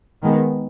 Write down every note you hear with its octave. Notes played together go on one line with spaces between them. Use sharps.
D#3 G#3 B3